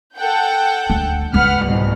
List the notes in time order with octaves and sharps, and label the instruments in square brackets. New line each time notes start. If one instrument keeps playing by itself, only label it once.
[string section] A4 F#5 G5
[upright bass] D2 G#3
[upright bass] C#2 G#3 [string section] B4 F#5 F6
[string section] C2 G#2 B2